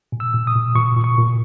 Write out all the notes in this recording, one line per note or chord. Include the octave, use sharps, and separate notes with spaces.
A#2
E6
A#2
D#6
A#2
A#2 C#6
A#2
C#6
A#2